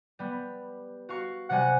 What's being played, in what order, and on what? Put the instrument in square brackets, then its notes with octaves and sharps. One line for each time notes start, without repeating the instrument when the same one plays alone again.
[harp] G3 B3
F#4 F5 C#6
[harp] C3 G3 G#5 [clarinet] F#5